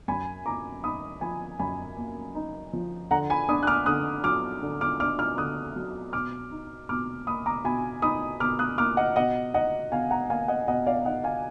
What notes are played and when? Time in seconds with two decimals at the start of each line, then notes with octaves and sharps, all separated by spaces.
0.08 F#2 G#5 B5
0.46 A#3 A#5 D6
0.84 D#4 B5 D#6
1.21 F3 G#5 B5
1.59 F#2 G#5 B5
1.97 A#3
2.35 D#4
2.73 F3
3.11 D3 F#5 A#5
3.30 G#5 B5
3.49 D4 B5 D#6
3.63 F#6
3.67 D6 F6
3.86 D3 D#6 F#6
4.24 F#3 D6 F6
4.62 D3
4.81 D6 F6
5.00 D4 D6 F6
5.19 D6 F6
5.37 D3 D#6 F#6
5.76 F#3
6.13 B2 D6 F6
6.51 D#4
6.89 B2 D6 F6
7.27 A#3 B5 D#6
7.46 A#5 D6
7.64 B2 G#5 B5
8.02 D#4 B5 D#6
8.40 B2 D6 F6
8.59 D#6 F#6
8.78 A#3 D6 F6
8.97 D#5 F#5
9.16 B2 D#5 F#5
9.54 D#4 D#5 F#5
9.92 B2 F5 G#5
10.11 F#5 A#5
10.30 A#3 F5 G#5
10.48 D#5 F#5
10.68 B2 D#5 F#5
10.86 D5 F5
11.05 D#4 D#5 F#5
11.24 F5 G#5